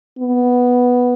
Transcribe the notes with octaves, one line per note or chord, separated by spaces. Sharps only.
B3